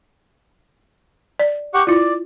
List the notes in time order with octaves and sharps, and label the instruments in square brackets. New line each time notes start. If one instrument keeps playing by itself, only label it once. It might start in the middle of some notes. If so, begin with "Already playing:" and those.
[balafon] D5
[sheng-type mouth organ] G4 F#5 C#6
[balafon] E4 F4 [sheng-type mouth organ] D5